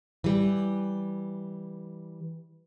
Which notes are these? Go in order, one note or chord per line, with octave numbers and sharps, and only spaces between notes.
E3 G3